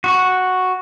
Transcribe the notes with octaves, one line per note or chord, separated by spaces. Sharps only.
F#4 C#6